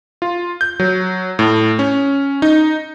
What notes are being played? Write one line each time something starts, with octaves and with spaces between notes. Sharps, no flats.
F4
G6
F#3
A2
C#4
D#4